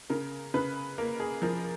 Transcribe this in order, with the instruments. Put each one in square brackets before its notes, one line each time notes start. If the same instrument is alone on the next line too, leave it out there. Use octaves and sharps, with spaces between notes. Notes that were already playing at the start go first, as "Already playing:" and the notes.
[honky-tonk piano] C#3 A#4
C#3 B4
A#3 A#4
G#4
F3 A#4